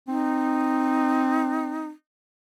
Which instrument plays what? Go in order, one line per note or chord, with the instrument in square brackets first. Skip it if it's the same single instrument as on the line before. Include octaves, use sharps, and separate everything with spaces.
[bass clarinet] C4 [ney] D#4